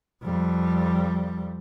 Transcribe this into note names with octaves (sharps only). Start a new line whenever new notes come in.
F2 G3